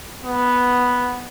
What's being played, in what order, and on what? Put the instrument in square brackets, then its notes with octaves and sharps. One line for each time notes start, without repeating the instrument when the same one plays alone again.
[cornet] B3